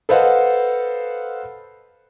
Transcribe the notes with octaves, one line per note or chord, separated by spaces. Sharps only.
A4 B4 C5 D#5 F5 F#5